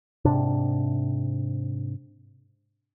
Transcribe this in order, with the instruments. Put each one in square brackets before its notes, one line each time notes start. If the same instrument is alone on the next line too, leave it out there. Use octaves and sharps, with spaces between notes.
[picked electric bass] G#2 C3 D4